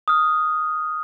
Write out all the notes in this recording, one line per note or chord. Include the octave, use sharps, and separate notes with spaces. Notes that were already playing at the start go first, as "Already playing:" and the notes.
D#6 F6